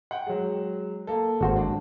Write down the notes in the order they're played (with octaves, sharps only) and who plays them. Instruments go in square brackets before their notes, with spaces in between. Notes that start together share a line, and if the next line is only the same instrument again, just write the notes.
[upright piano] F#5 G5
F#3 G#3
A#3 A4
[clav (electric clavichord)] G#1 F#4 C5
[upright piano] D4